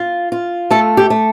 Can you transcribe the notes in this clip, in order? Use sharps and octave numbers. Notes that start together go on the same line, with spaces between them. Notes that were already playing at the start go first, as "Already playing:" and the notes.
Already playing: F4
F4
A3 A4
G4
A3